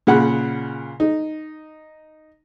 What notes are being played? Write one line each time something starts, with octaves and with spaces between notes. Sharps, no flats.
A#2 C#3 F#5 B5
D#4